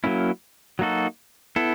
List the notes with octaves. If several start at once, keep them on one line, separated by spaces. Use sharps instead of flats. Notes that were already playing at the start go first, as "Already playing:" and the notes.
F#3 A#3 C#4 E4
F#3 A#3 D#4 F#4 A4
B3 E4 A4